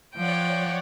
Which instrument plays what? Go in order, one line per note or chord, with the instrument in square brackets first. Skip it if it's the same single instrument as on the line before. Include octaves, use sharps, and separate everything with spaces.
[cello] F3 [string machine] C#5 D5 F#5 [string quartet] G5